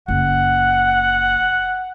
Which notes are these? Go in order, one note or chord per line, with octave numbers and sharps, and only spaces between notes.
F#1 F#5